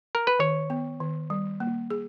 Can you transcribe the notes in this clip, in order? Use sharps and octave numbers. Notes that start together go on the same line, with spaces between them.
A#4
B4
D#3 C#5
B3
D#3
G3
A#3
G#4